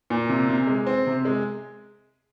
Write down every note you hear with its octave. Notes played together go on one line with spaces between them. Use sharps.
A#2
C3
C3
G#3
C4
C3
G#3